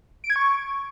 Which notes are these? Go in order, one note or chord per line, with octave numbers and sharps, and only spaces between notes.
D7
G#6
C#6